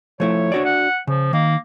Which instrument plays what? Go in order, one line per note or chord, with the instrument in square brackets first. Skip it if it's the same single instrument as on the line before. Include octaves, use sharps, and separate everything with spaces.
[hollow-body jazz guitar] F3 A3 E4 [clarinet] C#5
[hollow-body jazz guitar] D4 F#4 D5
[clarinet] F#5
[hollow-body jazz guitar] C#3 [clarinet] F3
[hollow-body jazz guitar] D#3 [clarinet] A#3